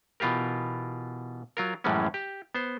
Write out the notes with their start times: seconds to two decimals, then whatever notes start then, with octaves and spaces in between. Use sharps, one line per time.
0.20 B2 E3 F4 G4 A#4
1.57 F#3 F4 A#4
1.84 F#2 A2 E3 G3 G#3 C#4
2.14 G4
2.55 B3 C5